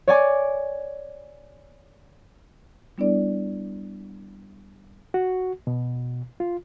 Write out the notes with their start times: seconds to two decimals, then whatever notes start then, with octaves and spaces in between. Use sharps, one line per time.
0.08 C#5 D5 G#5 D6
2.98 G3 B3 D4 E4 A4 D5
5.14 F#4
5.67 B2
6.40 F4